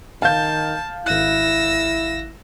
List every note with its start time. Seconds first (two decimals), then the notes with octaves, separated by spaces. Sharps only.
0.22 D#3 F5 A5 G6
1.06 G#1 E4 E6 F#6 A#6